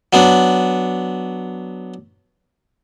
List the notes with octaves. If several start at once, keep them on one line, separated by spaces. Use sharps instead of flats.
F#3 B3 D4